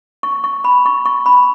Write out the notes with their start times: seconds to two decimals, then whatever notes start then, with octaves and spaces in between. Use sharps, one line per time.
0.23 C#6
0.44 C#6
0.64 B5
0.86 C#6
1.06 C#6
1.26 B5